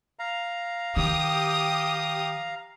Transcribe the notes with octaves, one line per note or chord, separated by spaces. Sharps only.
F5 A#5
D#3 G4 D#6